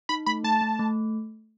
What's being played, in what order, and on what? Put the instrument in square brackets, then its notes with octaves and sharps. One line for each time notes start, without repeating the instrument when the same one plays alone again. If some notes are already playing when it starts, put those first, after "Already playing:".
[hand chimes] D#4 [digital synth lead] B5
[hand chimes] A3 [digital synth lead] B5
[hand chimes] A3 [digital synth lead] A5
[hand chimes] A3
A3